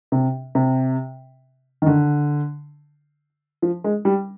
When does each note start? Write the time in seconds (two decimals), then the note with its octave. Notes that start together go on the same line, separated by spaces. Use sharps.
0.12 C3
0.55 C3
1.82 D#3
1.86 D3
3.62 F3
3.84 G#3
4.05 G3